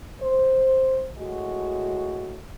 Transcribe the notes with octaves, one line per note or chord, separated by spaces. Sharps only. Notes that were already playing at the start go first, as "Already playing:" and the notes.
C5
A2 G#3 F#4